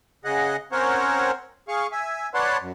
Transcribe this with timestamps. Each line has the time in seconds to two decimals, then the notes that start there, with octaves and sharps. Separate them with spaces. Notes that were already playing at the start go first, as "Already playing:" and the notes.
0.25 C#3 G#4 D#5 F#5
0.72 C4 C#4 A#4 C5 C#5 F#5
1.68 G#4 F5 C#6
1.92 E5 G#5
2.34 B4 C#5 D5 F#5 A5 C6
2.60 F#2